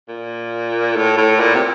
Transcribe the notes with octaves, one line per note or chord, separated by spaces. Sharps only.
A#2
A2
A2
A#2
C3